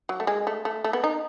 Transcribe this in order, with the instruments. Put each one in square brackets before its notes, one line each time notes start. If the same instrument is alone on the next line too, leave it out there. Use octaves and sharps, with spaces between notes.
[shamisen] F#3
A3
G#3
A3
A3
A3
B3
D#4